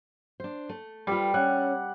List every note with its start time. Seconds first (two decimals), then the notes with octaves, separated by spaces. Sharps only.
0.40 D4 C5
0.69 A3
1.07 G3 F4 A4 B4
1.34 C#4 F#5